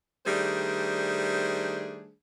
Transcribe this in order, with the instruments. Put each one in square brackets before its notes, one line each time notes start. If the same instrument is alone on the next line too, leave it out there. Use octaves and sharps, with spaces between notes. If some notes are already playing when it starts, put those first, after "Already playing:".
[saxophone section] D#3 G3 A3 D4 G#4 C5